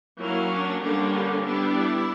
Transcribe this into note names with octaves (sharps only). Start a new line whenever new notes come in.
F#3 A#3 C#4 E4
D4
D3 G3 A#3 C#4 D4
G3 B3 D4 E4